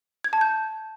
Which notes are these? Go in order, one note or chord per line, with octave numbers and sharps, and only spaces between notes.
G#6
A5
G6